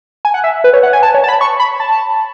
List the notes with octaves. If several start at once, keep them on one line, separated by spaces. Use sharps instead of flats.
G#5
F#5
E5
B4
C#5
F#5
G#5
A5
C#5
A5
B5
C#6
B5
A5